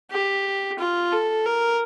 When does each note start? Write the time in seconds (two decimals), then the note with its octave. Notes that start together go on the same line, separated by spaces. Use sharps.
0.10 G4
0.78 F4
1.12 A4
1.45 A#4